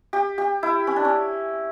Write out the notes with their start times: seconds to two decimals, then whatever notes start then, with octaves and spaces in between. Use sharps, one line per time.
0.13 G4
0.38 G4
0.63 E4
0.87 C#4
0.96 D4
1.05 C#4